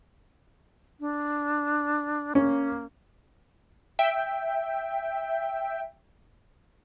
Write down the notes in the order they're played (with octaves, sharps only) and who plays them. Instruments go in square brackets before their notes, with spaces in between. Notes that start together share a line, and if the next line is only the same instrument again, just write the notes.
[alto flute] D4
[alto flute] A#3 [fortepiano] C#4
[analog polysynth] E5 G5